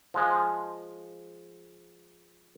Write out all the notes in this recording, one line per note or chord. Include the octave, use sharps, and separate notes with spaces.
F3 G#3